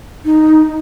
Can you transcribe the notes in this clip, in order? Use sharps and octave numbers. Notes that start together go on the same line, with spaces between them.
D#4